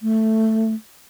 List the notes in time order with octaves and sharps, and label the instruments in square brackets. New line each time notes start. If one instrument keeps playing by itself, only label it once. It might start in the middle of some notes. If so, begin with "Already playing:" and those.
[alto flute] A3